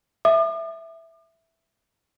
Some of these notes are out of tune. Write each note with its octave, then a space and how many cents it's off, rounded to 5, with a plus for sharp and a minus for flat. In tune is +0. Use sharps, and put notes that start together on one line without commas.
E5 +0 D6 +45